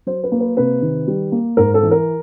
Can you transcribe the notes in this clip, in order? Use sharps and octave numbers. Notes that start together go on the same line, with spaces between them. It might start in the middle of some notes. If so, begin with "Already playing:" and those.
F#3 C5
B4
A#3
B4
C3 B4
D#3
G3
A#3
G#2 A#4
A4
E3
A#4